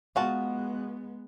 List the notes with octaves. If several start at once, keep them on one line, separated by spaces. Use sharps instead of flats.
G#3 B3 F4 F#4 A5